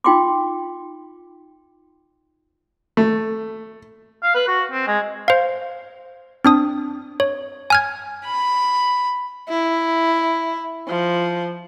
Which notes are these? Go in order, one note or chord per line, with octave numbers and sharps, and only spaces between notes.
D#4 F4 G5 C6 D6
A3
F5
B4
F#4
C4
G#3
C5 F5
C4 D4 D#6
C#5
G#5 F6 G#6
B5
E4
F3